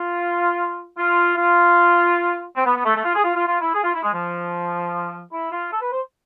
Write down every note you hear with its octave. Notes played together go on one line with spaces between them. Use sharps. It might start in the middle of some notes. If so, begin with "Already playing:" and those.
Already playing: F4
F4
F4
C4
B3
B3
A3
A3
F4
G#4
F4
F4
F4
E4
G#4
F4
E4
G#3
F3
E4
F4
A4
B4
C5